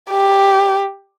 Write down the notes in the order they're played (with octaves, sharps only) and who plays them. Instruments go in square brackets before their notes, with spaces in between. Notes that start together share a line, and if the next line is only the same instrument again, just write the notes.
[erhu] G4